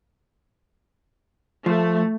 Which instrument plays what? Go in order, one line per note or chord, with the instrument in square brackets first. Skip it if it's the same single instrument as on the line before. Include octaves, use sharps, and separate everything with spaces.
[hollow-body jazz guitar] F3 [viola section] A3